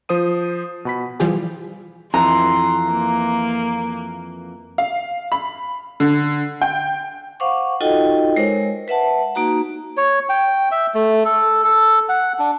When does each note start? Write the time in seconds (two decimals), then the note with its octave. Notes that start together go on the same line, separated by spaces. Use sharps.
0.09 F3 C5 D#6 D#7
0.85 B2 B5 B6
1.20 E3 F3 G3 F4 G4 G#4
2.14 F2 E3 A#5 C6
2.91 A#3
4.78 F5
5.32 B5
6.00 D3
6.62 G5
7.40 C5 F5 F#5 C#6 D6
7.81 D#4 F4 F#4 A4 D#5 G5
8.36 G#3 A#4 C5 C#5
8.88 B4 E5 F#5 A5
9.35 A#3 D#4 F#4 A#5
9.97 C#5
10.29 G5
10.71 E5
10.94 A3
11.25 A4
11.64 A4
12.09 F#5
12.39 D4